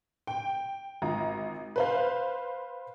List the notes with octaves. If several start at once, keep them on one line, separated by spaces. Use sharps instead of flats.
G5
G#1 F4 A#5
B4 C5 F5